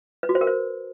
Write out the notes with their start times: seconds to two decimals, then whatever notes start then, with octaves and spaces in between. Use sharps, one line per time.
0.23 B4
0.29 F#4
0.35 C5
0.41 A#4
0.47 C5